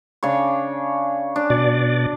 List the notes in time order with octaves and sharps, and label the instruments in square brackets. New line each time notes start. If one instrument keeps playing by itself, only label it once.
[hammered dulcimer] C#3 D4 C#5
D4
[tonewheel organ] B2 D5